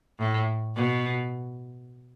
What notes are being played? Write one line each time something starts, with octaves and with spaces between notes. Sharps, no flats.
A2
B2